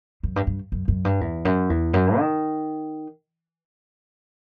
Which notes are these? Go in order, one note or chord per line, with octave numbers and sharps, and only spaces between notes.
F#2
G2
G2
F#2
F#2
G2
E2
F#2
E2
F#2
D#3